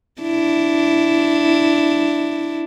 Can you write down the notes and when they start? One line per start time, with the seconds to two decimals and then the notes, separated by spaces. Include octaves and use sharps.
0.21 D4 E4